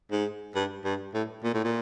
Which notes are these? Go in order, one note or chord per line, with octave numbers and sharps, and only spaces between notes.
G#2
G2
G2
A2
A#2
A2
A#2